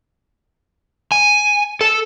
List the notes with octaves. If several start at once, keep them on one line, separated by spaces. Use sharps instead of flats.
G#5
A4